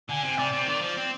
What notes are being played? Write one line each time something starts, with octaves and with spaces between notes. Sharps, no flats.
D3 G#5
C3
C3 D5
C3
D#3 D5
F3
C4